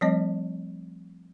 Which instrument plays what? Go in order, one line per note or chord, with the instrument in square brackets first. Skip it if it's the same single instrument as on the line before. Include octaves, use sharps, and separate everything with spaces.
[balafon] F3 G3 A3 C4 C#5 D#5